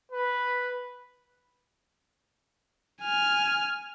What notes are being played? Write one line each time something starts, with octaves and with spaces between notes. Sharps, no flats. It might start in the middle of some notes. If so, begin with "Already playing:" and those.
B4
G#5 F6